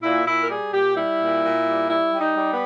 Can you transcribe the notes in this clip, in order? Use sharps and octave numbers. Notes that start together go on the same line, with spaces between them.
A#2 E4
A#2 E4
A#4
G3 G#4
A#2 G4
G3 E4
A#2
A#2
G3
G3 E4
G3
D#4
G3
B3